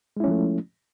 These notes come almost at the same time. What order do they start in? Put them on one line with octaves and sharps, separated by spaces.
G#3 E4 C#4 F3 A3